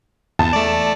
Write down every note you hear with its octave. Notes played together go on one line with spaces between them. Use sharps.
E2 A5
A3 D5